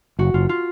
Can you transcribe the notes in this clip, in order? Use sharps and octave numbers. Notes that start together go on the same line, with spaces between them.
F#1 F#4
F#1 F4
F4